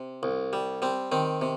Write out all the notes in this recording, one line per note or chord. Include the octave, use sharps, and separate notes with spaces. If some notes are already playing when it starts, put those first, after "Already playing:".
Already playing: C3
C2
G3
G3 C4
D#3 C4
C3